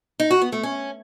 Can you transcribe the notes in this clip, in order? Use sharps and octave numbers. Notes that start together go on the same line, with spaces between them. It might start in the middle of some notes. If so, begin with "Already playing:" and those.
D#4
F#4
B3
A3
C#4